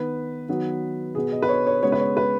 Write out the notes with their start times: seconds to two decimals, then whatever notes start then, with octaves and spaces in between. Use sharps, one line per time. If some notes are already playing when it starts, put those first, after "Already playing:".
Already playing: D#3 B3 B4
0.49 D#3 F#3 B3
1.15 B2 B3 G#4
1.32 D#5
1.42 B4
1.49 C#5
1.67 C#5
1.83 C#3 G#3 B3 C#5
1.92 B4
1.99 C#5
2.17 B4